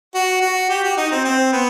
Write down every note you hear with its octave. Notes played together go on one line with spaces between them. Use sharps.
F#4
F#4
G4
F#4
D#4
C4
C4
B3